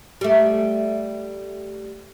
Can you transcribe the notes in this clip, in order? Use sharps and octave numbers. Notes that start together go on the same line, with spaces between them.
G3 A3